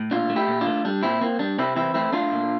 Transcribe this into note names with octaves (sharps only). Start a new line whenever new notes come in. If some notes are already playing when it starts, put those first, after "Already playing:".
Already playing: A2
A#2 D4 F4
A3
E4 G4
A#2
D4 F4
A3
G3 D4
A#2 C4 E4
A#3 C4
G3 D4
C3 C4 E4
E3 C4 E4
A3 C4 E4
A3 D4 F4
A#2